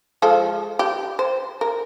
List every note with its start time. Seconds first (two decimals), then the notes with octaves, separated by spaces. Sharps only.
0.22 F3 G#3 A4
0.79 G4
1.19 C5
1.61 A#4